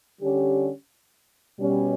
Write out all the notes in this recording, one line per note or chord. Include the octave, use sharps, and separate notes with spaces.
D3 G3 C#4 G4
B2 G3 C#4